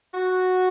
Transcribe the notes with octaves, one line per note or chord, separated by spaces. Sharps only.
F#4